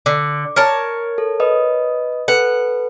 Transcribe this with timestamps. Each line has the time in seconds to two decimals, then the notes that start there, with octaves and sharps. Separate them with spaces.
0.06 D3 D6
0.56 A#4 C#5 A5
1.18 A4
1.40 B4 D#5 D#6
2.28 A4 B4 F#5